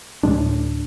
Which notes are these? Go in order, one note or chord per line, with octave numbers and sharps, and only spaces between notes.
D2 A2 G#3 D4